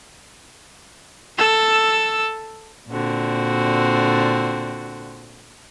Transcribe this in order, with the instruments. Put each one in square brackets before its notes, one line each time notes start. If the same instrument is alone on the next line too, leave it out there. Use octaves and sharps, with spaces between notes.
[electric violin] A4 E6
[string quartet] A#2 D3 C4 F#4